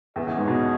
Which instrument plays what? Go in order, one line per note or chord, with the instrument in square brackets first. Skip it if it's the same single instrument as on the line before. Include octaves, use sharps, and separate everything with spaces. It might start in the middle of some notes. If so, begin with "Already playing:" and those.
[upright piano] E2 [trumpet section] C#4 G#4 D#5 F#5
[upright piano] E2
G#2
B2